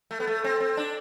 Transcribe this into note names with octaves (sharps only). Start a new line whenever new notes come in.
A3
B3
A3
C4
C4
D4